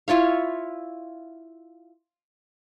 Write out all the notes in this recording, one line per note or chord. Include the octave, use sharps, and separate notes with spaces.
E4 F4 C#5 F5